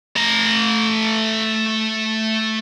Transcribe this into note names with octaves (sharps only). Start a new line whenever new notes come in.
A3 A#5